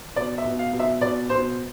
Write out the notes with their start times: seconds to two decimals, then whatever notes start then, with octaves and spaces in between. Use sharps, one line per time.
0.16 B2 D5
0.38 E5
0.45 B2
0.59 F5
0.73 B2
0.79 E5
1.01 B2 D5
1.29 B2 C5